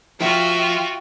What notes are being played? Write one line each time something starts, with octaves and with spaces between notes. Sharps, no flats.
F3 F4 F#4 E5 F5 G5